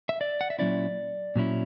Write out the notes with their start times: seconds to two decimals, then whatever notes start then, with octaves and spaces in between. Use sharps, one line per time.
0.09 E5
0.21 D5
0.41 F#5
0.50 E5
0.59 A#2 F#3 C#4 E4 D5
1.36 A#2 F#3 C#4 E4